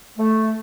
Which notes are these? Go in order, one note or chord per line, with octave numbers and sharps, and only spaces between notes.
A3